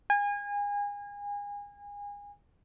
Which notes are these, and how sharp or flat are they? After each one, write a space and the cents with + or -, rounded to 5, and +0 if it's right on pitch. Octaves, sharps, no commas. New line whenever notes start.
G#5 -30